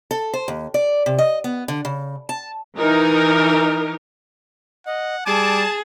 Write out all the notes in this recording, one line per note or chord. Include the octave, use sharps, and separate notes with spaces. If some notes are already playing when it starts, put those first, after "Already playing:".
A4
C5
D#2
D5
C3
D#5
B3
D3
C#3
A5
E3 D#4 A#4
D#5 F#5
G3 G#4 A5 D6